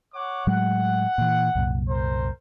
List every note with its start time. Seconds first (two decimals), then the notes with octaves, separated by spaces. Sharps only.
0.14 C#5 F#5 D6
0.47 A2 F#3 G#3 F#5
1.18 A#2 E3
1.55 C2 F#2 A#2
1.89 A#4 C5